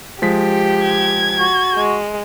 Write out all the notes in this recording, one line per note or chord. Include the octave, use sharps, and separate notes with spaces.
F3 G#3 G4 B6
G#6
F#4
G#3